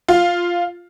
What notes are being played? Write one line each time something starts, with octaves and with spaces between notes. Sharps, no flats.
F4